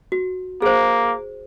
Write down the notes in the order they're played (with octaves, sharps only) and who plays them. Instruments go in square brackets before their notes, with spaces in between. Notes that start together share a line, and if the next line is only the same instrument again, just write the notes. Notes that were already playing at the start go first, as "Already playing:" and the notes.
[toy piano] F#4
[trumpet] A#3 [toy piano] G#4 C5